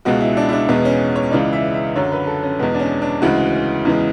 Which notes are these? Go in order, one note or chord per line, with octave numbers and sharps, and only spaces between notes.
C#2 B2 G#3 F#4
E4
D4
E4
D4
E2 B2 G#3 B3
C#4
C#5
C#2 C#3 E3 G#3 D5
E5
E5
F#2 D3 F#3 C#5
B4
A4
C#4
E2 B2 G#3 B3
D4
C#4
D4
D2 C#3 E3 G#3 F#4
E2 C#3 E3 G#3